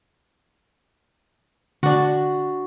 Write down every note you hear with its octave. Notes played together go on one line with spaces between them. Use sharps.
D3 D4 F#4